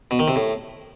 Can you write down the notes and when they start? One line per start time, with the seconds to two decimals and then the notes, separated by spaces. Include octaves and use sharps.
0.11 B2
0.19 D#3
0.28 C3
0.36 A2